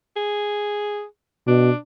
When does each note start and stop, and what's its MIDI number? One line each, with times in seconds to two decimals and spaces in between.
0.16 1.04 68
1.47 1.71 47
1.47 1.77 62